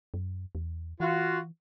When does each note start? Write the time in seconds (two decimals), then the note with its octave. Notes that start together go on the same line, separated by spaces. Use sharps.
0.14 F#2
0.55 E2
1.00 E3 F4 F#4